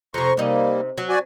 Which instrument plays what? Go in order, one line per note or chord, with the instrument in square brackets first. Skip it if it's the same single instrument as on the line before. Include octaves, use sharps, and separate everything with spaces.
[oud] F2 C3 [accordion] A#5 C6 C#6
[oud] C3 D#4 [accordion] G3 A#3
[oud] F#3
[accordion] F#4 D5 G#5